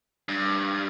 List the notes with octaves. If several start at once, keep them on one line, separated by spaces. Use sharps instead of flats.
G2